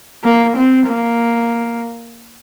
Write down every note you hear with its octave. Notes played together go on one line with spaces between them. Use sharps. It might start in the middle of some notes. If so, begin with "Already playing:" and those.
A#3
C4
A#3